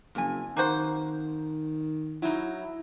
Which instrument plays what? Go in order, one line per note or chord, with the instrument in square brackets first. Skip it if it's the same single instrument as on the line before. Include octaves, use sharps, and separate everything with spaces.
[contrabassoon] F#1 [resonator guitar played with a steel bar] F2 G#5
[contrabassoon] D#3 [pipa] A#3 F#4 C5
[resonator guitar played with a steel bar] F#3 D#4 [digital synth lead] E4